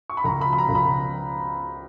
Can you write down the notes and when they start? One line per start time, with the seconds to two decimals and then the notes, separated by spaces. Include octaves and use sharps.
0.10 C#6
0.17 B5
0.24 C#2 A#5
0.41 B5
0.47 F3
0.53 B5
0.58 A#5
0.69 C#2
0.75 B5